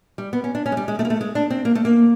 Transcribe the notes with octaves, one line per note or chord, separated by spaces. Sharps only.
G3
B3
C#4
D4
C#4
G#3
G3
G#3
A3
A#3
A3
G#3
D4
C4
A#3
A3
A#3